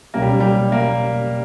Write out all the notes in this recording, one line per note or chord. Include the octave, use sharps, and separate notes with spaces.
C#2 B2 F#3 A#3 C#4 G4
G3
G3
A#3